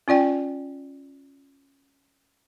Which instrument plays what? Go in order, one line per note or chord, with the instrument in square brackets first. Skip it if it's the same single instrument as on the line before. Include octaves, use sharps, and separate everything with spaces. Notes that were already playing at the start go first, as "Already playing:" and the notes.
[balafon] C#4 F4 D5 G5